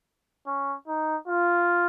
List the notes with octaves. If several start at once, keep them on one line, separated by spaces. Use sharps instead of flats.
C#4
D#4
F4